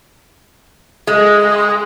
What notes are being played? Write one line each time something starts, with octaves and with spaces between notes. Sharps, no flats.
G#3